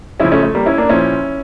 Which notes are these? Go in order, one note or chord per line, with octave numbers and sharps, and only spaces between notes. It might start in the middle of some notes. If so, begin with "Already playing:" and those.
C#3 F3 C#4 E4
A3 C#4
A3
G3 A#3
C#4 E4
A#3 D4
A#2 F3 C#4 E4